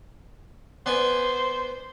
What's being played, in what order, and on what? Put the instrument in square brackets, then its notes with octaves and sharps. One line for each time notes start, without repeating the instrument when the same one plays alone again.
[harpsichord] B3 D5 G#5 [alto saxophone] C5